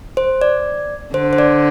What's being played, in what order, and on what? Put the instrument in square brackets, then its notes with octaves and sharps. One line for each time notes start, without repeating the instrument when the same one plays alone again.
[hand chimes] C5
D5
[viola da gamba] D3 [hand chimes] C5
[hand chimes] C5
D5